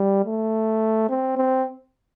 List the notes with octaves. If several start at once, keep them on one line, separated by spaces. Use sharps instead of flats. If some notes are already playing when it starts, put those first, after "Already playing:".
Already playing: G3
A3
C4
C4